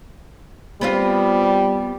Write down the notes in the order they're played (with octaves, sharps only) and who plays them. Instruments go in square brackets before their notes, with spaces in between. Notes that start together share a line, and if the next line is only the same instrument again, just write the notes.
[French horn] G3 [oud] B3 C4 F4